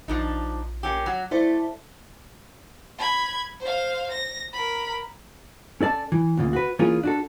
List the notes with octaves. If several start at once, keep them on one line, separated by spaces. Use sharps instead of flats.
A#1 F3 D4 D#4
A#3 C#4 G4
F#3
A3 E4 C5 D5
B5 G#6
C5 F5
A#6
A#4 B5
C#4 A4 D5 A5
E3
D2 A#2 C#3
F#4 B4
E3 A#3 C#4 F4 G#4
D4 F#4 A4